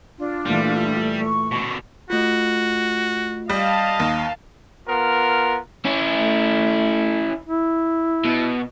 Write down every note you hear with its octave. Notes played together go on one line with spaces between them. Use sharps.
D4 F4
A#2 E3 G3 A3
C#6
B2 D3
A3 F4 F#4
G3 D#5 F5 A5
D#2
B3 F4 A#4
C#4 E4
A3
E4
B2